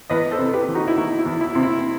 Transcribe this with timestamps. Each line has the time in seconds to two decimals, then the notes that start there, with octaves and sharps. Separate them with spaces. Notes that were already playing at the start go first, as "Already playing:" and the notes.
0.10 E2 B4 D#5
0.31 A4 C5
0.39 C3
0.53 G4 B4
0.68 E3
0.75 D#4 F#4
0.87 E4
0.97 E2 D#4 F#4
1.19 E4
1.25 E2
1.41 E4
1.55 C3
1.63 E4